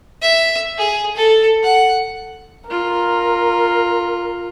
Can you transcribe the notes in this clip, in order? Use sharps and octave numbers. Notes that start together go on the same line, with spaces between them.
E5
G#4
A4
F#5
F4 A#4